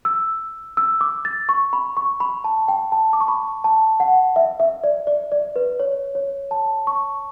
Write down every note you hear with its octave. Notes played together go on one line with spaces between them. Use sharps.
E6
E6
D6
A6
C#6
B5
C#6
B5
A5
G5
A5
D6
C#6
B5
A5
F#5
E5
E5
D5
D5
D5
B4
C#5
C#5
A5
C#6